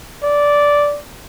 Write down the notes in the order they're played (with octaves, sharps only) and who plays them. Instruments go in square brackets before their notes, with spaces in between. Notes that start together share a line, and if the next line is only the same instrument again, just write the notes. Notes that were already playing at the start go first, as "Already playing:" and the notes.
[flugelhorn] D5